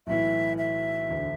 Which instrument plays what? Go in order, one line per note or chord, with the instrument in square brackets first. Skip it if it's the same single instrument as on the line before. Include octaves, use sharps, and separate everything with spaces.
[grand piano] B1 A2 E3 [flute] E5
[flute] E5
[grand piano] E1 D2 D3